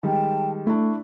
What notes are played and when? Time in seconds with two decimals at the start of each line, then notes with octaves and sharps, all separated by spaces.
0.03 D#3 G3 G#3 G5 A5
0.67 A3 D4 E4 C#6